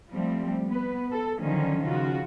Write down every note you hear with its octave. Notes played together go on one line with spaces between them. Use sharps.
F3 G3 A3 C4
B3 B4
A4
D3 D#3 F3 F#3 C#4
C#3 F4 F#4